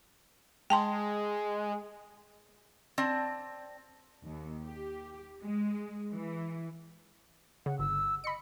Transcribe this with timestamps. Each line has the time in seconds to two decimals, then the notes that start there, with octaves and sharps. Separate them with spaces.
0.70 G#3 G5 A5 C6
2.98 C4 D5 A5
4.26 D#2
4.65 G4
5.44 G#3
6.12 E3
7.66 C#3 F#5
7.79 G1 E6
8.24 D#5 B5 C#7